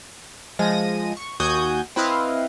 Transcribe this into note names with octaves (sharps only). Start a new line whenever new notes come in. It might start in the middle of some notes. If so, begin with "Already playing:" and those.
F3 G#3 A#6 D#7
C#6
D#2 F#4 G#5 D#6 G6 G#6
C4 E4 B4 D#5 F5